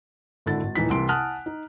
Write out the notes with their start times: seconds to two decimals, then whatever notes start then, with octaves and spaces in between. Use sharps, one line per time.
0.46 G#1 D3 E4 A6
0.63 G#1
0.75 D#1 E3 D#4 B6
0.90 C2 C3 E3 C6 D7
1.08 F#5 G#5 A5 D#6 F6 F#6
1.46 D#4